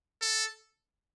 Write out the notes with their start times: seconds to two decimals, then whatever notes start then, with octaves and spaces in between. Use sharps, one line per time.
0.22 A4